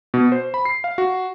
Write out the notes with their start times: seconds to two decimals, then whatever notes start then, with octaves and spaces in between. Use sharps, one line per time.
0.14 B2
0.32 C5
0.54 B5
0.65 C7
0.84 F5
0.98 F#4